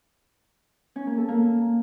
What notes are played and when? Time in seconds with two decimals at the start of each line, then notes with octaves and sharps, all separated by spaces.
0.96 C#4
1.07 A#3
1.17 A4
1.28 A#3